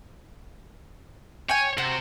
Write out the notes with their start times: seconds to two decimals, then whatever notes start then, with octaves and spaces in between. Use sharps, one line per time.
1.49 C#5 G5 G#5
1.78 C3 F#4 C5